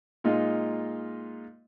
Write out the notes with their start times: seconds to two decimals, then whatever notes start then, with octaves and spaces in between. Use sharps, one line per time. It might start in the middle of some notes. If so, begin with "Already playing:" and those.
0.24 A#2 G#3 D#4 F4 D#5